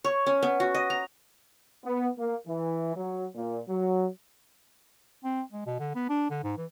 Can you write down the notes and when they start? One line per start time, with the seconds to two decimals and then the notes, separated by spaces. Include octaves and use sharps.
0.04 C#5
0.26 C#4
0.43 B3
0.60 F#4
0.74 D#5
0.90 A#5
1.85 B3
2.18 A#3
2.47 E3
2.96 F#3
3.35 A#2
3.69 F#3
5.24 C4
5.52 G#3
5.66 B2
5.79 D3
5.95 B3
6.09 D4
6.30 D3
6.44 G#2
6.58 E3